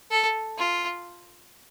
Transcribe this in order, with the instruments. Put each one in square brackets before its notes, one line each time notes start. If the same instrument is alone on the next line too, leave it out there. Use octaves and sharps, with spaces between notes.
[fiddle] A4
F4